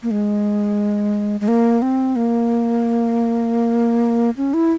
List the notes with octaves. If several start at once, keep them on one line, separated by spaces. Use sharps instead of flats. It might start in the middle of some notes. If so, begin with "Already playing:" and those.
A#3
G#3
G#3
A#3
C4
A#3
C#4
E4